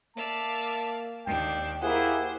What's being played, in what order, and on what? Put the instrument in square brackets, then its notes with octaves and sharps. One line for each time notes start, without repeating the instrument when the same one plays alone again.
[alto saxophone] A#3 [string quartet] D5 E5 F5 [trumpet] A5
[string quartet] D#2 D4 [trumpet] G5
[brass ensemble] A#3 E4 G#4 [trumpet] G4 [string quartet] C5 [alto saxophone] F#5